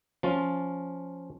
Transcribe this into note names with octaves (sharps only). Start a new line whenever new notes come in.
F3 C#4 F4